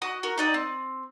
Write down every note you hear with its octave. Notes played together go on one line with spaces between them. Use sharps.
F#4 D#5 D#6
F#4 A#4
D#4 D5 D#5 G5
C4